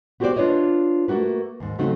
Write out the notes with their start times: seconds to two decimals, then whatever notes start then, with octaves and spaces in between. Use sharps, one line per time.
0.20 B3 F#4 G4 B4 C5 D5
0.36 D4 F4 B4 C#5 D#5
1.08 A3 A#3 F#4 B4
1.60 D#2 G#2
1.78 C#3 F#3 A3 C4 D#4 F#4